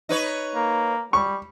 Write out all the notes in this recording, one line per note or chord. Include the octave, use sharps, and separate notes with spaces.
D#4 B4 C#5
A#3
G3 C#6